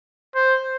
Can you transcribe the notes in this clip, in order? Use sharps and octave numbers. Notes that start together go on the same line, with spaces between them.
C5